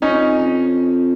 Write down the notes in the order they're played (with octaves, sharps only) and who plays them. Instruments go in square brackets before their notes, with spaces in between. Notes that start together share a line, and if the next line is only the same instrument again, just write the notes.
[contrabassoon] F2 [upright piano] C#4 D#4